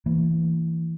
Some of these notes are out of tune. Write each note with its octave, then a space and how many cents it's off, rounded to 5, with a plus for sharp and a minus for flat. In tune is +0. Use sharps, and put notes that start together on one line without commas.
E3 +0 A#3 -35